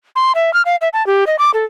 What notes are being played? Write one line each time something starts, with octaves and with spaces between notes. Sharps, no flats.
C6
E5
F6
F5
E5
A5
G4
D#5
D6
A4